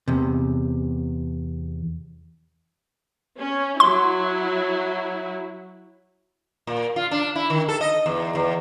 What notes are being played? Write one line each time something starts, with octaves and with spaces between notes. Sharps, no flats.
E2 C3
C#4
F#3 E4 C6
A#2
F4
D4
E4
D#3
A4
D#5
E2
E2